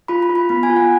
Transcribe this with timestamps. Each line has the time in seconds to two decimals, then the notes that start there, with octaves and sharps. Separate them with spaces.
0.08 F4 B5
0.22 B5
0.30 F4
0.35 B5
0.49 B3 B5
0.63 G#5
0.70 F4
0.76 F#5